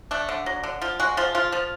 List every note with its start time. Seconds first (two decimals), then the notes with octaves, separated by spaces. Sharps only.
0.11 A3 D4
0.29 D3
0.46 F#3
0.64 D3
0.81 F3 F4
1.00 G#3 F#4
1.17 F3 F4
1.35 F3 F4
1.52 F3